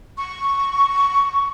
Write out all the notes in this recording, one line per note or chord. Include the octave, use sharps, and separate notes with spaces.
C#6